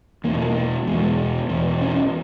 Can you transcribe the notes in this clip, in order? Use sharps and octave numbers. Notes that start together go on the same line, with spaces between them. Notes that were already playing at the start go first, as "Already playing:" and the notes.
E2 B2 A#3
E2 B2 G#3
E2 B2 B3
C#4